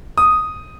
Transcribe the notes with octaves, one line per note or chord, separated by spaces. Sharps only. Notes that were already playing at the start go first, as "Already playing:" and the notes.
D#6